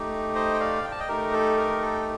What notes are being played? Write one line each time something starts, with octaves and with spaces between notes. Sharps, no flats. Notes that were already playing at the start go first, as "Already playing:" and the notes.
Already playing: A3 D#4 G4
C5 D#5
G5
D5 F5
G5
A5
D#5 G5
A3 D#4 G4 A#4
A4
A#4
A4